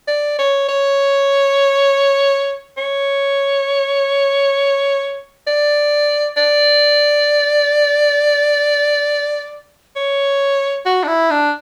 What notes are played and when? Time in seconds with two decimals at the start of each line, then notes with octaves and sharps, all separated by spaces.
0.08 D5
0.38 C#5
0.68 C#5
2.77 C#5
5.47 D5
6.37 D5
9.96 C#5
10.86 F#4
11.03 D4
11.08 E4
11.31 D4